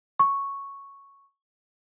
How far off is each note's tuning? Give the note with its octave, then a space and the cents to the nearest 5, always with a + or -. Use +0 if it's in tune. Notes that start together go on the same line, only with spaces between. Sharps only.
C#6 +0